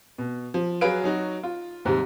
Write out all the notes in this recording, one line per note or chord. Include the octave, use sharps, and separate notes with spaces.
B2
F3
F#3 G#4 B4 F5 D7
F#3 D#4 F#4
F4
D#2 G#2 C3 G3